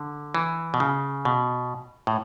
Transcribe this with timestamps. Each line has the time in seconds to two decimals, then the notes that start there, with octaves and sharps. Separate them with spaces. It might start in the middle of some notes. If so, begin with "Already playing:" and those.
Already playing: D3
0.35 E3
0.74 B2
0.80 C#3
1.25 B2
2.07 A2